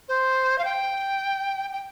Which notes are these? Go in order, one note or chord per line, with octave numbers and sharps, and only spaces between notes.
C5
F5
G5
G5